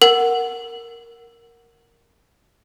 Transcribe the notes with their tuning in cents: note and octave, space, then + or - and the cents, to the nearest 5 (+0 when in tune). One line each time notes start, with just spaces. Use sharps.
A#4 +0 F#5 +0